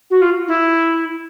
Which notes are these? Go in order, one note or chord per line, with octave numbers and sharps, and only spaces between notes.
F#4
F4
E4